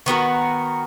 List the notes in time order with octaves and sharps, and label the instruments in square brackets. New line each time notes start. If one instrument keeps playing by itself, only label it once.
[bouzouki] D#3 B3 F#4 A#4